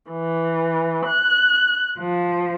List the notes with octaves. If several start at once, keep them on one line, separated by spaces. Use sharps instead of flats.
E3
F#6
F3